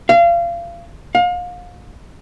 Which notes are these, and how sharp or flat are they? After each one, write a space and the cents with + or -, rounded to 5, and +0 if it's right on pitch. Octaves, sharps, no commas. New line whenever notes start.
F5 -30
F5 +35